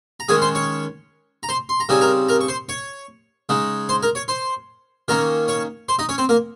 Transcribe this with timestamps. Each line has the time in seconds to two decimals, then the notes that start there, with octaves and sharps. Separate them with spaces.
0.20 A#5
0.28 D#3 G#3 C#4 G#4 G#5
0.42 C5 C6
0.55 C#5 C#6
1.43 A#5
1.49 C5 C6
1.69 C6
1.80 A#5
1.89 C#3 G3 C4 D#4 G#5
2.01 A#4 A#5
2.29 A#4 A#5
2.41 C#6
2.48 C5 C6
2.69 C#5 C#6
3.49 C#3 G#3 D#4
3.89 C5 C6
4.03 A#4 A#5
4.15 C#5 C#6
4.28 C5 C6
5.08 D#3 A#3 C#4 A#4 A#5
5.48 C#5 C#6
5.89 C5 C6
5.99 D#4 D#5
6.09 C#4 C#5
6.18 C4 C5
6.29 A#3 A#4